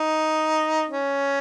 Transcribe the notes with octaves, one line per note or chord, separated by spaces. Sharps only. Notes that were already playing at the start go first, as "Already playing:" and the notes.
Already playing: D#4
C#4